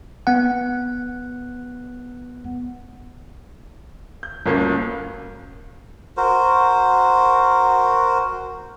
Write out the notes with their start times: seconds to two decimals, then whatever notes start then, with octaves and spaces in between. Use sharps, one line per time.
0.27 B3 F#5
4.23 G6
4.46 G1 D2 A#3 C#4
6.17 F#4 A#4 C5